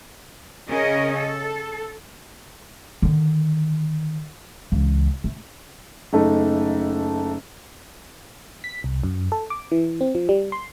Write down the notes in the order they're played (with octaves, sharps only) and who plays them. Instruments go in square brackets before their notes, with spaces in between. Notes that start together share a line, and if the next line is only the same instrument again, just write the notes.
[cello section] C#3 C#4 A#4 D#5
A4
[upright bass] D3 D#3
C#2 E3
A3
[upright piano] F#1 A3 D#4
[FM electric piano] B6
C2
F#2
A4
D6
E3
C4
F3
G3
C6